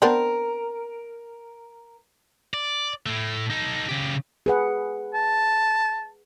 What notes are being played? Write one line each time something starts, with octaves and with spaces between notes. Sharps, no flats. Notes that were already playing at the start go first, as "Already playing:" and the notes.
B3 C4 D4 A#4
D5
A2 A3
D#4 A4
C#3 G4
G#4 B4 F#5
A5